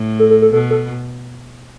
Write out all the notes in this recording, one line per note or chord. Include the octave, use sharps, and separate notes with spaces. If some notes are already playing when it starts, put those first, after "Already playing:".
Already playing: A2
A4
A4
A4
B2 A4
A4